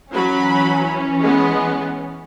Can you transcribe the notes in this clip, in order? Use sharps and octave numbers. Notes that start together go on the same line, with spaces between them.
E3 F#3 C#4 B5
G#3 B3